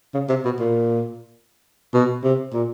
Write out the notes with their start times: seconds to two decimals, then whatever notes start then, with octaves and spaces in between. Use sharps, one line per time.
0.14 C#3
0.29 C3
0.45 B2
0.60 A#2
1.94 B2
2.24 C3
2.53 A#2